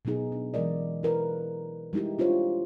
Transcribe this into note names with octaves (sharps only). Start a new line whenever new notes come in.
B2 F#3 B3 D#4 G#4
D4
E3 F#3 G#3 A#4 D5 D#5
E4 A#4 B4
G3 G#3 D#4 E4 G4
D4 F4 G4 C5 C#5